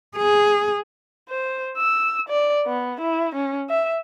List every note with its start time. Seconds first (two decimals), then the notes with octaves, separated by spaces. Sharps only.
0.17 G#4
1.29 C5
1.78 E6
2.29 D5
2.66 B3
3.01 E4
3.35 C#4
3.69 E5